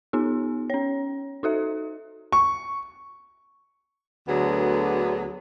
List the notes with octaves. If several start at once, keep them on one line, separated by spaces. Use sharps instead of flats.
B3 D#4 G4
C#4 C#5
D#4 F#4 A4 E5
C#6
D2 D3 F#3 B3 G#4